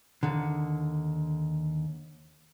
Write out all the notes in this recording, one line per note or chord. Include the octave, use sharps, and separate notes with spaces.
D#2 D3